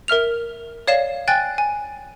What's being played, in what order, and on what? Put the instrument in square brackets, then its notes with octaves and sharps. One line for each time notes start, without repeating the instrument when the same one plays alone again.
[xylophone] A#4 E5 F6 F7
C#5 D5 F5 C7 E7
G5 G#5 F#6 A6
G#5